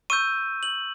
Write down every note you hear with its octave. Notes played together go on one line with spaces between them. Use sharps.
C#6 E6 G6 D#7
F#7